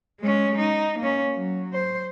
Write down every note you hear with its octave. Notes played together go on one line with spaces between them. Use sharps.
G#3 C#4
D#4
A#3 C#4
F#3
C5